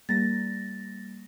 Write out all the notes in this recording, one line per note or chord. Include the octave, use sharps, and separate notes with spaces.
G3 A#3 A6 A#6